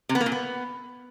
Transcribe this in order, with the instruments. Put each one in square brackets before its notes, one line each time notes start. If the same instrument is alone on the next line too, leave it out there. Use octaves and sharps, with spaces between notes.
[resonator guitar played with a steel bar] C3
B3
A#3
A#2
B3